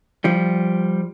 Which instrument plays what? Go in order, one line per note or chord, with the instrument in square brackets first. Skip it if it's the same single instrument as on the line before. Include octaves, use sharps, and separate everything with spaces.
[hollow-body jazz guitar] F3 G3